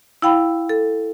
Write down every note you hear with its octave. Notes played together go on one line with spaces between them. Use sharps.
E4 F5 G5 B5
A4